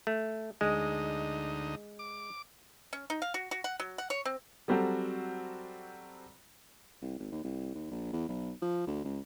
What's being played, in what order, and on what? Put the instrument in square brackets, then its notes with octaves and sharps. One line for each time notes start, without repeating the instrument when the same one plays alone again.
[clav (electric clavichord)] A3
[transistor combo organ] D2 D#4 [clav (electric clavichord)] G#3
[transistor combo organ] D6
[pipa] C#4
D#4
F5
F#4
F#4
F#5
F#3
F#5
C#5
C4
[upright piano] F#3 G3 C4 F#4 A4
[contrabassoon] C2
G#1
D#2
C2
D#2
A#1
E2
B1
F3
D2
C#2